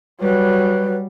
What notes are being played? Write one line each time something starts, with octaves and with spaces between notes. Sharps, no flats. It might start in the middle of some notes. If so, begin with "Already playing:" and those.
F#3 G3 B4